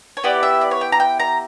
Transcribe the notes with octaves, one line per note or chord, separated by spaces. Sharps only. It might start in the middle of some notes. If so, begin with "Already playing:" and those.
C#5
B3 E4 G4 D5
E5
D5
C#5
G5
A#5
G5
A#5